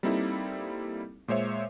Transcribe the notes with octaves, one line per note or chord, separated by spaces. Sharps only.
G3 A#3 C4 D#4 E4 A4
A#2 G#3 C5 C#5 E5